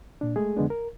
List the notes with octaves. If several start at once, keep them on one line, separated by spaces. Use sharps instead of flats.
A#2 D4
G#3 A3 G#4
F2 D3 G#3 B3 D4
A#4